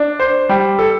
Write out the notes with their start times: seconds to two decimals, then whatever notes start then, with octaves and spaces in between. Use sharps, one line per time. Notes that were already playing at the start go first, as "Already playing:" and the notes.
Already playing: D4
0.20 C5
0.49 G3
0.79 A4